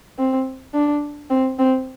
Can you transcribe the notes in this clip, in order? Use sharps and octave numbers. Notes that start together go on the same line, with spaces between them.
C4
D4
C4
C4